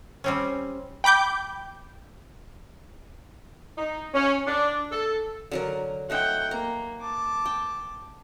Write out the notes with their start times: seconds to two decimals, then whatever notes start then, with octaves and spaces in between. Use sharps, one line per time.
0.24 G3 C4 C#4
1.04 G5 B5 D6 G6
3.78 D#4
4.13 C#4
4.46 D4
4.91 A4
5.51 D3 F#3 A#4
6.10 A3 D#4 E5 F#5 G5
6.51 A#3 A#5
7.01 A5 D6
7.46 G5